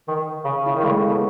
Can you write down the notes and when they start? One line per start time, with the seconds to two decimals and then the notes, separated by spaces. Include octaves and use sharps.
0.08 D#3
0.44 C#3
0.66 C#3 E4
0.76 D#3
0.83 G#3
0.86 C#3 A3
1.09 C#3 B3